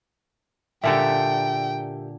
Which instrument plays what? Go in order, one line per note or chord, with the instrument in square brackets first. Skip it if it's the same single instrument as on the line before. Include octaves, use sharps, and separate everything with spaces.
[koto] A#2 D3 A4 [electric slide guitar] G4 A#4 E5 [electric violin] G5